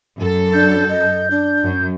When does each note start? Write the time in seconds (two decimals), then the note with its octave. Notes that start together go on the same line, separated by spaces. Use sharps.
0.19 F#2 A4
0.53 D4 G6
0.89 D#5
1.31 D4
1.63 F#2